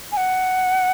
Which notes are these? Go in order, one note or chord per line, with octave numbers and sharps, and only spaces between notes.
G#5
F#5